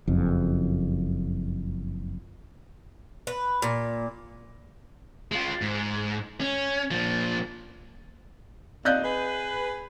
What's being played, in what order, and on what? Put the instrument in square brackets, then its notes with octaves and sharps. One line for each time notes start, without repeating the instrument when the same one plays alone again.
[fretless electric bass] F#1 F2
[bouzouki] B4
A#2
[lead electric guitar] G#3 F4
G#2
C#4
A#2 F3
[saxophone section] D#2 A#2 [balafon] C4 D5 F5 [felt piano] D#5 F#6 G6
[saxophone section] G#4 B4